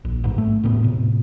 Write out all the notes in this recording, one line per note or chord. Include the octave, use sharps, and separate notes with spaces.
A#1
A1 G#2
A3
E1 A2 B3
A2 C3